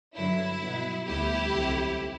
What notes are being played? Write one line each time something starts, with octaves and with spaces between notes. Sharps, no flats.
G2 D3 F#3 E4
B2 F#3 B3
D2 D3 G3 B3 E4 G4
C2 C3 F#3 A3 C4